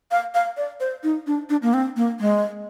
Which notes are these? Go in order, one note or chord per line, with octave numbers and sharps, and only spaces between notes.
F5
F5
D5
C5
D#4
D4
D4
A#3
C4
A#3
G#3